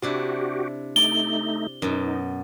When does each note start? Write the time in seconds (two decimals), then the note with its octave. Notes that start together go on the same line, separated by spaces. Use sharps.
0.02 C3 D4 E4 F#4 G4
0.96 A3 D#4 D5 G7
1.82 F#2 B2 D#4